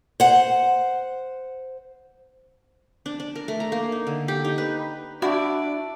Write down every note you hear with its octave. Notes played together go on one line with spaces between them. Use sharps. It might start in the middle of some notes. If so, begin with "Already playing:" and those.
C5 F#5
D4
D4
A#4
A3
A#5
A#3
D#4
D3
G4
D#4
B4
D4 E4 F#4 D5